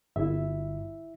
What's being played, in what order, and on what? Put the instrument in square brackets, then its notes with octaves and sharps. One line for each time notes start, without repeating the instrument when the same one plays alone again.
[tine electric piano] G1 [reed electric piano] E4 E5